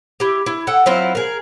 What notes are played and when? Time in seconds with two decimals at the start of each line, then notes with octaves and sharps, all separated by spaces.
0.20 E4 G4
0.46 E4
0.67 A4 F#5 G5
0.86 F#3 C4 E4 F4
1.15 G#4 A#4